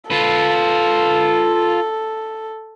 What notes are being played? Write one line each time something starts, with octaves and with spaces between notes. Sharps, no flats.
F4 A4 B4